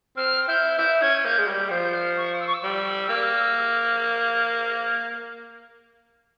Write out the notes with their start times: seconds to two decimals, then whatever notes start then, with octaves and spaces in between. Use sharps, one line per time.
0.17 C4 F6
0.48 E4 G6
0.78 E4 G6
1.01 C#4 G#6
1.24 A#3 G6
1.38 G#3
1.47 G3 G6
1.70 F3 G6
1.84 G6
1.94 F6
2.17 C#6
2.40 E6
2.47 C#6
2.54 E6
2.63 G3
3.09 A#3